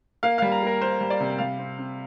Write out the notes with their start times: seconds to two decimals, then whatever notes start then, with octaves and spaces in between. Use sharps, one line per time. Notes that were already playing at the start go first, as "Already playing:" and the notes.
0.23 A#3 F5
0.38 G3 F5
0.52 A#5
0.62 A#3 A#4
0.81 A#3 C5
1.01 G3
1.10 D5
1.20 C3
1.39 G3 F5
1.59 C4
1.78 C4